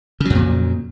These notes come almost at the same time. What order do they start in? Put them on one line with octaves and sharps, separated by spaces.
C#3 F#3 F2 A#2